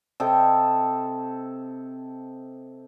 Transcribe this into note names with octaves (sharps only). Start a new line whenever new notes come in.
C3 A4 D#5 G5